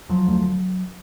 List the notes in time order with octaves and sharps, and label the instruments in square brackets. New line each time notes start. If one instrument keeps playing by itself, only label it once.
[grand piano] F3 [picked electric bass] F#3
[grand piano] D2